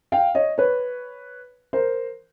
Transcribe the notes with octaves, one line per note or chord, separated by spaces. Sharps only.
F5 G5
C#5 D#5
B4 C#5
A#4 C5